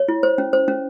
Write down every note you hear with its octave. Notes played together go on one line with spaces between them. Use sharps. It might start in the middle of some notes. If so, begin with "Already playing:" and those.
Already playing: C#5
E4
C5
C#4
C5
C#4